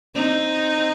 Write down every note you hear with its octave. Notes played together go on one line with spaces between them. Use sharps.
C4 D#4